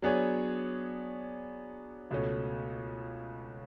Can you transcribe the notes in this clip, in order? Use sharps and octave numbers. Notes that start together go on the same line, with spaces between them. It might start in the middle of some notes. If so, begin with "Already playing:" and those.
F#3 B3 D4 G#4 C#5
C#2 B2 A3 C#4